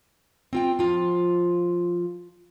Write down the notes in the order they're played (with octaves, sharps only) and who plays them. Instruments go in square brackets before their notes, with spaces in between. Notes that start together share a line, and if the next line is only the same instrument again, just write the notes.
[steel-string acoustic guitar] C4 F4 G5
F3 F4